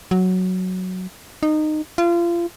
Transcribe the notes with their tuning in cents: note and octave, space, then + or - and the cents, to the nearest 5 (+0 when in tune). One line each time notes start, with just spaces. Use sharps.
F#3 +0
D#4 -20
F4 -30